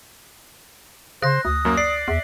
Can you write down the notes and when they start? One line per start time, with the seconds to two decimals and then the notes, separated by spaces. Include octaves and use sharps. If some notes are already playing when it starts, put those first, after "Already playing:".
1.22 C#3 C5 F#6 A#6
1.45 D2 D#6
1.65 F#2 A#3
1.77 D5 C7
2.08 E2 E5